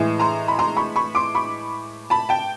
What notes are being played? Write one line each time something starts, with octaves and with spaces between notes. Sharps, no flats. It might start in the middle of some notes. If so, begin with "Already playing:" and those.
Already playing: A2 E3 G#3
A#5 C6
B5
A#5 C6
B5 C#6
B5 C#6
C6 D6
B5 C#6
A5 B5
G5 A5